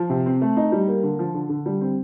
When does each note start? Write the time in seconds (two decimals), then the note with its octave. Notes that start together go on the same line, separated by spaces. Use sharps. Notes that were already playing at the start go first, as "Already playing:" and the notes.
Already playing: F3
0.10 C3
0.26 C4
0.41 A3
0.57 D#4
0.72 G3
0.88 A#3
1.03 D3
1.19 F3
1.34 D3
1.49 D3
1.66 G3
1.81 C4